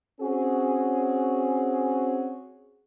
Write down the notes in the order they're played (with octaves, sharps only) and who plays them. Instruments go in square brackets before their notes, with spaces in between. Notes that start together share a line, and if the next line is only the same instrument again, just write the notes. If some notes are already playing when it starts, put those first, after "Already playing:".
[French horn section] C4 C#4 F#4 G#4